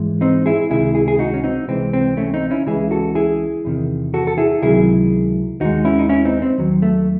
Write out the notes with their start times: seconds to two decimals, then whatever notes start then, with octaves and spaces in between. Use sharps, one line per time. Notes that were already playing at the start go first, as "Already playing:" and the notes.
Already playing: G#2 E3 G#3
0.21 C4 D#4
0.46 E4 G#4
0.70 C#2 C3 D#3 G#3 E4 G#4
0.95 E4 G#4
1.08 G#4
1.19 D#4 F#4
1.34 C#4
1.44 C4 D#4
1.68 C#2 C3 E3 G#3 C4
1.93 C4
2.17 A3 C#4
2.34 C4 D#4
2.51 C#4 E4
2.66 C#2 C#3 E3 G#3 E4 G#4
2.91 F#4 A4
3.15 E4 G#4
3.65 E2 C3 D#3
4.14 F#4 A4
4.27 A4
4.38 E4 G#4
4.62 C#2 C3 D#3 F#3 E4 G#4
5.61 D#2 D#3 G#3 D#4 F#4
5.85 C#4 E4
5.99 D#4
6.09 C#4 E4
6.25 C4 D#4
6.42 C4
6.58 D#2 D#3 F#3
6.82 A3